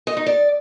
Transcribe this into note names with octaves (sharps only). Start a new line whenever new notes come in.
D#5
D#4
D5